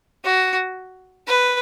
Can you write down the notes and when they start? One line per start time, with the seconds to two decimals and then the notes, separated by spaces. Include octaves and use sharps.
0.24 F#4
1.27 B4